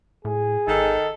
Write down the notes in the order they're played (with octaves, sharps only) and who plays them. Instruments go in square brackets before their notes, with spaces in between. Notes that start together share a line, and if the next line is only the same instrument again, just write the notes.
[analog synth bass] A2 [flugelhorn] G#4
[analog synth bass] G#1 [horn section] D#3 D#4 A4